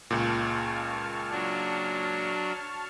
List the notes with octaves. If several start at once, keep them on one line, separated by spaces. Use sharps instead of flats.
C#2 A#2 A5 C#6 F6
F#3 D4